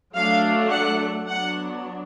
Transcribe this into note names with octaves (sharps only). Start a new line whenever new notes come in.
F#3 A3 D4 F5
F#5
F#3 B3 D4 F#5